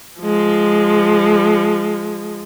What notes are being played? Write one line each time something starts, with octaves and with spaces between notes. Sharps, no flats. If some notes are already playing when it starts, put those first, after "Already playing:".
F3 G#3